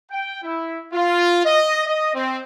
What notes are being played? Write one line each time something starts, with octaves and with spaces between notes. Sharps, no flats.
G5
E4
F4
D#5
D#5
C4